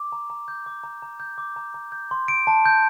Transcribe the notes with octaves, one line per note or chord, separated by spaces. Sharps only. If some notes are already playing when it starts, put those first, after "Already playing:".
Already playing: D6
A#5
A#5
G6
D6
A#5
A#5
G6
D6
A#5
A#5
G6
C6
D7
A5
G6